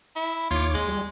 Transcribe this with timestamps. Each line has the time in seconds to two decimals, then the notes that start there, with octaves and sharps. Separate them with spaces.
0.16 E4
0.51 D#2 F4 C#5 D6
0.74 G#3
0.88 G3